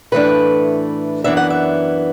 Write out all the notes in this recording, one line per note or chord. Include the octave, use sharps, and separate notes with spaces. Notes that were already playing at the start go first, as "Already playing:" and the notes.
A2 E3 A3 D4 B4
F#2 E3 B3 D4 E5
F#5
E5